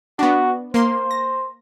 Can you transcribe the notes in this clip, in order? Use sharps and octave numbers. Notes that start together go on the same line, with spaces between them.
B3 D4 F#4
A#3 C5 C6
A#6